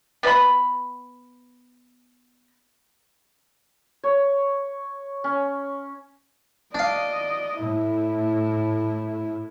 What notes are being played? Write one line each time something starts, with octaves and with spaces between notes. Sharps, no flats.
B3 B4 D#5 B5
C#5
C#4
D4 D5 D#5 F5
A2 E4